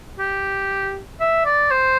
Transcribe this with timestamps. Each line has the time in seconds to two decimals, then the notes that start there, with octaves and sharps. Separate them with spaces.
0.19 G4
1.20 E5
1.46 D5
1.71 C5